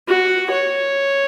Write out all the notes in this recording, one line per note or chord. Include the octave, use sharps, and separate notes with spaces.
F#4
C#5